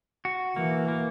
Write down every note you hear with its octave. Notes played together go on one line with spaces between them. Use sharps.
F#4
E3 A#3
A#3